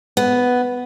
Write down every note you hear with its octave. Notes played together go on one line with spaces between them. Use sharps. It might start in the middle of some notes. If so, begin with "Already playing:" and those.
B3